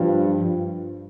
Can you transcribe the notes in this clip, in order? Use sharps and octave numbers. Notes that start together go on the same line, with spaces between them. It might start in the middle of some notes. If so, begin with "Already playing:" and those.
Already playing: G2 F3